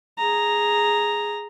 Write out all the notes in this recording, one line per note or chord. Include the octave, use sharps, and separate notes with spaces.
G#4 A#5